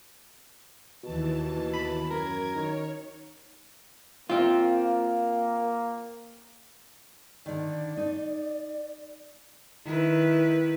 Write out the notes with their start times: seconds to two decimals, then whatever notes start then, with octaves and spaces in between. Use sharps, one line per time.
1.04 D#2 B2 E3 A5
1.73 B5
2.10 F#2 A#4 G#6
2.55 D#3 C#5
4.30 A#3 C4 F4
7.46 D3 D#3 D5
7.97 D#4
9.85 D#3 E4 B4